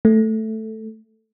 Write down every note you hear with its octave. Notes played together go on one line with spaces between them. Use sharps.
A3